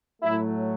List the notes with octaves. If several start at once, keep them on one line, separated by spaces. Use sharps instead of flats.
A2 F#3 A3 E4